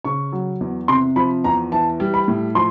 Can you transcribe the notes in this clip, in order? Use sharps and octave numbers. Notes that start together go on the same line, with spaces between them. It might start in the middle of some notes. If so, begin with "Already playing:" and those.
C#3 C#6
F#3
E2
C3 C6
F3 B5
E2 A#5
E3 A5
G3
B5
A2
F3 C6